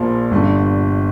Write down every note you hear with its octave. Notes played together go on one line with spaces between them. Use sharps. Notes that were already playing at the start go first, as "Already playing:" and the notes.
Already playing: A#1 A#2 F3
G1 G2 D3